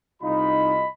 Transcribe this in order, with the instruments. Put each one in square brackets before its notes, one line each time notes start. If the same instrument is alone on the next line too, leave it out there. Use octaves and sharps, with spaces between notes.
[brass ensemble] C2 F4 D#5 [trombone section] D#4 [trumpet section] B5